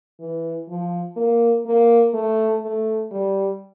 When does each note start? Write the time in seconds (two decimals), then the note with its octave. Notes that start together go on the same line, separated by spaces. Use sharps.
0.20 E3
0.68 F3
1.16 A#3
1.65 A#3
2.14 A3
2.62 A3
3.11 G3